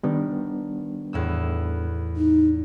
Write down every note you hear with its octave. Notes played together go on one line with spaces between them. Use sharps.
D#3 G3 B3 D4
E2 A2 E6
D#4